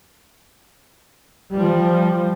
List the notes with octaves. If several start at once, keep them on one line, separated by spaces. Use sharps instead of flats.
F3 G3